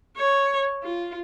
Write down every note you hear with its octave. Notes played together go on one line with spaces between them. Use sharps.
C#5
F4